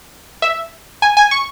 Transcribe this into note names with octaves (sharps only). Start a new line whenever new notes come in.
E5
G#5
G#5
C#6